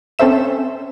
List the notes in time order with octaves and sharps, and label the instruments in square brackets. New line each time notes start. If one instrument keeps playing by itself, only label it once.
[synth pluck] C4 C#4 A4 C5 E5 E7